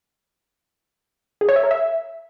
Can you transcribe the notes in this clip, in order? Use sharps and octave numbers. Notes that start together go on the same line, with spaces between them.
G#4
C#5
E5
A#4
E5